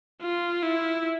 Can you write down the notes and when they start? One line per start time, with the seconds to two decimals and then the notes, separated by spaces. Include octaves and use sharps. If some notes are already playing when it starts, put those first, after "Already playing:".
0.21 F4
0.63 E4